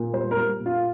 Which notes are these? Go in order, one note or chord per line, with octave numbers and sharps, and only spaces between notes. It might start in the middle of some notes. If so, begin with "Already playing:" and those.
Already playing: A#2
G3 C5
A#4
G3
A#2
F4